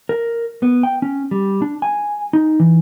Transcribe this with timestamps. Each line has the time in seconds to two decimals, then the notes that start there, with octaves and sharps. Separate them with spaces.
0.09 A#4
0.63 B3
0.83 G5
1.02 C#4
1.31 G3
1.62 D4
1.82 G#5
2.33 D#4
2.60 E3